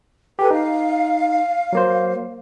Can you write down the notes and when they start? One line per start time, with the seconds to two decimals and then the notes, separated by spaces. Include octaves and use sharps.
0.39 G4 A4 B4 G#5
0.51 D#4 F5
1.73 F#3 A#3 C5